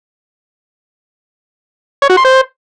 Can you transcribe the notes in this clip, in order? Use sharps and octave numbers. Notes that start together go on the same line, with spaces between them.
C#5
F#4
C6
C5